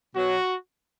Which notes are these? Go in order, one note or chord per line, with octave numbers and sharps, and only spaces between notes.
B2 F#3 F#4